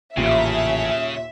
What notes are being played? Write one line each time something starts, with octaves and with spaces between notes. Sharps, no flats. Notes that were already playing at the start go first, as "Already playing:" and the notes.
A1 D#2 A#2 C#3 E5